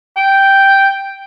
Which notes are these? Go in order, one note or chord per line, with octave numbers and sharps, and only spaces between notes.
G5